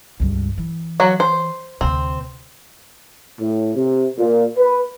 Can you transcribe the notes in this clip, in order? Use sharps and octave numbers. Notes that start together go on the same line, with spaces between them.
C#2 G2
E3
F#3 F#4
C5
D2 C3 C4
A2
C3
A#2
B4